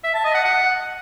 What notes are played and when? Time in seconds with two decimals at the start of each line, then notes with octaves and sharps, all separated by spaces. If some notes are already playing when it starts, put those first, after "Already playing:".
0.04 E5
0.14 A5
0.24 D#5
0.34 F#5
0.45 F#5